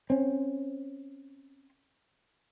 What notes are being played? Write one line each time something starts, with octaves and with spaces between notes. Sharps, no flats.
C4 C#4